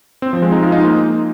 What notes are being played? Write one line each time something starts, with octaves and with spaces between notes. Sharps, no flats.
C4
F3
G#3
D#4
F4
D#4
A#3